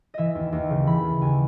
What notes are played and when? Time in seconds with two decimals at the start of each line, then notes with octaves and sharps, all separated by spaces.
0.14 E3 D#5 E5
0.35 D#2
0.52 D#2
0.70 C#3
0.87 E3 B5
1.04 D#2
1.21 D#2 G#5